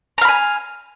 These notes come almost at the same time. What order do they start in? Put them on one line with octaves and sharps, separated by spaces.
A#5 F5 B5 G#5